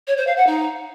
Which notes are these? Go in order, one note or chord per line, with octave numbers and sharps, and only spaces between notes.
C#5
C5
F5
F#5
D#4